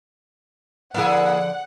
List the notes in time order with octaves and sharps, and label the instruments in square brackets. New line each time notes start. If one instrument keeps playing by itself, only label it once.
[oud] D3 F3 F5 [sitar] A#3 E4 G#4 [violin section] F#5